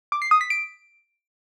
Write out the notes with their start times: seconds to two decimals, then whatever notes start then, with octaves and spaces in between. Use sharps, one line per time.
0.12 D6
0.22 C7
0.31 D#6
0.41 B6
0.50 D7